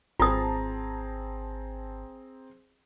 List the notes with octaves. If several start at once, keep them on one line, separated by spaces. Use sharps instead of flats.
G#1 C4 F4 G#4 A5 A#5 D#6